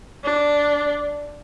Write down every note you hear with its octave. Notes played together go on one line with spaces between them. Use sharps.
D4